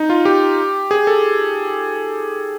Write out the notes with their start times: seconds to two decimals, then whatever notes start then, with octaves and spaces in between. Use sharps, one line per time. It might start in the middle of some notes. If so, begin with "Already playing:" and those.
Already playing: D#4
0.10 F4
0.25 G4
0.91 G#4
1.07 A4